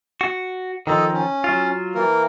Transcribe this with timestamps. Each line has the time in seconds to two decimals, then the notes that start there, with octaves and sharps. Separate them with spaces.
0.21 F#4
0.87 D#3 F3 A4 D#5
1.13 C#4
1.44 F#3 F4
1.95 E3 A#3 A#4